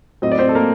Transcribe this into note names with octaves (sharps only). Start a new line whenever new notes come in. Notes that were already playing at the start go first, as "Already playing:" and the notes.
A2 F#3 C4 D#5
D5
C4 C5
A4
A#3 A#4